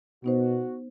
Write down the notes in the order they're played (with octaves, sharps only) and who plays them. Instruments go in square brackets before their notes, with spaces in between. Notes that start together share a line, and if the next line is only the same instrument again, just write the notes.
[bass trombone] B2 [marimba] B3 D#4 C5 [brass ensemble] F#4